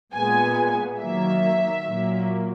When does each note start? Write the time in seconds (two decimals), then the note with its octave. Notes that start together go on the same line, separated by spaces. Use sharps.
0.13 A#2 G#3 B3 G#5
0.99 D#3 F#3 A#3 E5
1.85 A#2 F#3 A#3